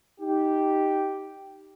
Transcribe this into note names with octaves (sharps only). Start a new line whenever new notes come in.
D#4 G4